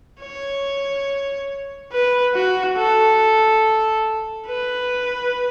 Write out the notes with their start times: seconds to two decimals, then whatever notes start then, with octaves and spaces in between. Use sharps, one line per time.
0.21 C#5
1.92 B4
2.34 F#4
2.77 A4
4.47 B4